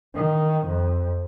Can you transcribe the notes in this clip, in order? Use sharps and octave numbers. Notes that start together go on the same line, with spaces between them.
D#3
F2